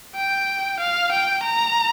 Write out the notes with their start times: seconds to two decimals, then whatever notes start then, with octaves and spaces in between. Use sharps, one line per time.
0.16 G5
0.80 F5
1.12 G5
1.43 A#5